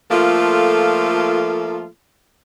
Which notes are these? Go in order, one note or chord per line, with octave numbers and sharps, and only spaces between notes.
F3 A3 A#3 F4 A4